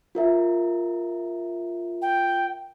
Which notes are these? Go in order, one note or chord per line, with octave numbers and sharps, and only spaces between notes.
F4 A#4 E5
G5